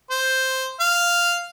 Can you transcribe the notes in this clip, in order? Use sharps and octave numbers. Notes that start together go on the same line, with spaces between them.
C5
F5